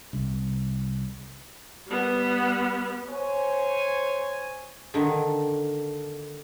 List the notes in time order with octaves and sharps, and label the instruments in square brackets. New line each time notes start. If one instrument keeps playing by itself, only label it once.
[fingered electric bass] C2
[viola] G3 B3
[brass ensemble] C5 C#5 G#5
[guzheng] D3 D#3